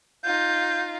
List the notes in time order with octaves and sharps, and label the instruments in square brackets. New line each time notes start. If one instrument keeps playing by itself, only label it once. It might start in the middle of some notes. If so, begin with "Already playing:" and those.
[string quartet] D#4 F4 [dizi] G6